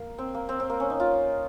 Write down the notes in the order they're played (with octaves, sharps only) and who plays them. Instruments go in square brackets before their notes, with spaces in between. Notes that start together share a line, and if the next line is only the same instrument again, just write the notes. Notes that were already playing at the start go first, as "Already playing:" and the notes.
Already playing: [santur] A#3
C4
A#3
C4
C4
A#3
C#4
D#4
F4